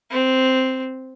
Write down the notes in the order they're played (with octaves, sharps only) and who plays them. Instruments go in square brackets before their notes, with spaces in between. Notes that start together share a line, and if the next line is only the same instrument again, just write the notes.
[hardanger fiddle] C4